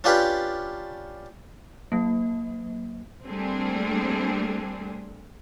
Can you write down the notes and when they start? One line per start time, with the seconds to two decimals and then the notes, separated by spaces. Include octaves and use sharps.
0.04 C#4 D4 F4 G4 B4
1.92 F#3 A#3
3.27 G3 A3 A#3 C4 D4 G#4